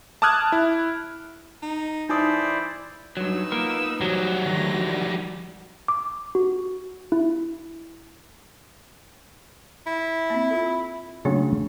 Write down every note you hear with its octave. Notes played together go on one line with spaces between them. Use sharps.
A5 D6 D#6 F6 F#6 G#6
E4
D#4
E3 D#4 E4 C5 D5 D#6
G2 F#3 D#4 B4 E6
A#3 B3 F4 A#4
E3 F#3 G3 F#4 C5
D3 D#3 F3 A3 A#6
D6
F#4
E4
E4
A#3 C4
F4 A4
C#3 F#3 A3 A#3 D4